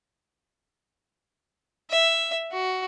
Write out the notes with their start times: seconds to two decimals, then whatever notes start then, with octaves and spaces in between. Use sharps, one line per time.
1.90 E5
2.52 F#4